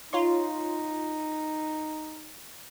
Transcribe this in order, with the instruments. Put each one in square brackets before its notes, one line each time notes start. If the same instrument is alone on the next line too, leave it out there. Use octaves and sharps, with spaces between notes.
[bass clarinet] D#4 [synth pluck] F4 C#5 C6